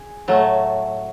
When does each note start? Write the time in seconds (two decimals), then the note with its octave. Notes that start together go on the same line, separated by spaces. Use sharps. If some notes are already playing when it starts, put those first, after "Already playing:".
Already playing: G#4
0.28 A2 F#3 A3